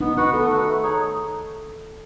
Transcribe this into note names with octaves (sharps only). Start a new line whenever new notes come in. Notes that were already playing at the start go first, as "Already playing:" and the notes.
B3 D#4
D#4 F#4 B4 F#5
B3 A4
F#4 B4 F#5
A3
D#4 G#4 C#5